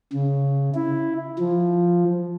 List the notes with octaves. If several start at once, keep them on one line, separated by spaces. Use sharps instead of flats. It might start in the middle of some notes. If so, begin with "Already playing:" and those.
C#3
E4
F3